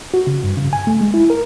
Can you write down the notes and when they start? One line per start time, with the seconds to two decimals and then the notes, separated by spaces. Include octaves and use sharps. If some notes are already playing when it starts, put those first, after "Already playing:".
0.14 F#4
0.27 C#3
0.44 G2
0.57 C#3
0.73 G#5
0.87 A3
1.01 G#3
1.14 E4
1.30 A#4